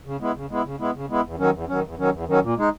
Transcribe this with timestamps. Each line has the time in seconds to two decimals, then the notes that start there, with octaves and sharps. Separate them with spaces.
0.05 C#3
0.20 G#3 B3 E4
0.34 C#3
0.49 G#3 B3 E4
0.64 C#3
0.79 G#3 B3 E4
0.94 C#3
1.09 G#3 B3 E4
1.24 E2
1.38 D#3 F#3 C#4
1.53 E2
1.68 D#3 F#3 C#4
1.83 E2
1.98 D#3 F#3 C#4
2.13 E2
2.27 D#3 F#3 C#4
2.42 A#2
2.57 G#3 D#4